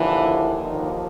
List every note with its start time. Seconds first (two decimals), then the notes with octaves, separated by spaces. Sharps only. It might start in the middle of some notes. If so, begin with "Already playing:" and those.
Already playing: D#2 D3 E3 F3 E4
0.61 D#2 D3 D#3 F3 D#4